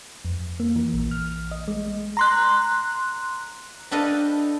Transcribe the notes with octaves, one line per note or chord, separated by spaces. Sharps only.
F2
A#3
E3
A#1
F6
D#5
G#3
A#5 C6 F#6
D4 G4 A4 B4 D#5 F5